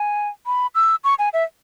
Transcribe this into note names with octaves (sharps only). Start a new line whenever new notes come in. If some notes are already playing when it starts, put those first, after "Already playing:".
Already playing: G#5
B5
E6
C#6
G#5
E5